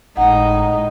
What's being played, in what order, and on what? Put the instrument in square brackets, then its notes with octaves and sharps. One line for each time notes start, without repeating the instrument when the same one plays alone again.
[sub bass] G#1 [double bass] A2 G#3 [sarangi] D#4 [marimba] F#5